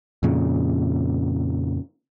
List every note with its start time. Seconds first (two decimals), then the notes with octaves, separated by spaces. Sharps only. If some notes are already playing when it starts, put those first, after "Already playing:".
0.23 F2 A#2 C#3